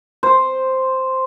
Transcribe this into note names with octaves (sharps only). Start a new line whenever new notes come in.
C5